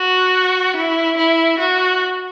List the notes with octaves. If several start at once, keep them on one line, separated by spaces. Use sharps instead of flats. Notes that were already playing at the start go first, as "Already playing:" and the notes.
Already playing: F#4
E4
E4
F#4